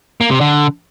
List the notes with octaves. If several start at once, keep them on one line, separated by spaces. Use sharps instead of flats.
A#3
C3
D3